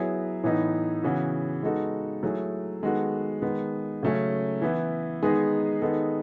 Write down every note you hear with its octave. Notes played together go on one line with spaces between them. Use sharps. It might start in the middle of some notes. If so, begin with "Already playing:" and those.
Already playing: F#3 B3 E4 G#4
A2 E3 B3 D#4
C#3 E3 B3 F#4
G#3 B3 D#4 F#4 A4
F#3 A3 E4 G#4
D#3 G#3 B3 F#4 A4
D#3 G#3 B3
C#3 F#3 A3 C#4
E3 B3 E4
D#3 G#3 B3 D#4 G#4
D#3 G#3 B3 D#4 A4